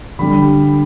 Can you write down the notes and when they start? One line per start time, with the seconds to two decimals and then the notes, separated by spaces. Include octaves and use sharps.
0.19 D3 G3 B5